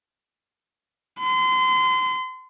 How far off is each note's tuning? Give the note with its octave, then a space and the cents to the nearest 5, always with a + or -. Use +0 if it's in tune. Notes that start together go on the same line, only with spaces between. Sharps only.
C6 -30